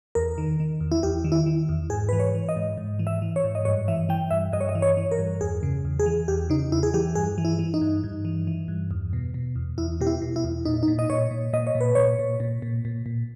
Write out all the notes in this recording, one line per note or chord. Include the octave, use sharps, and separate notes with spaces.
E2 A#4
D#3
D#3
E2
E4
E2 G4
D#3
E4
D#3
E2
G#2 G#4
E3 B4
C#5
E3
D#5
G#2
G#2
E3
E5
E3
C#5
G#2
D#5
G2 C#5
E3 E5
E3 G5
G2 E5
G2 D#5
C#5
D#5
E3
C#5
E3
A#4
G2
E2 G#4
C#3
E2
G#4
E3
E2 G4
C#3 D#4
E2 E4
G#4
E3 G4
G2 G#4
E3
E4
E3
D#4
G2
G2
E3
E3
G2
E2
B2
B2
E2
E2 E4
B2 G4
E4
B2
E4
E2
A#2 D#4
D#4
A#2
D#5
A#2 C#5
A#2
A#2 D#5
C#5
A#2
B4
A#2 C#5
A#2
A#2
A#2
A#2
A#2